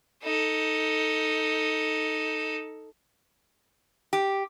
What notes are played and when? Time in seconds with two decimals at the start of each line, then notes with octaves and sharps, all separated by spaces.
0.23 D#4 A4
4.13 G4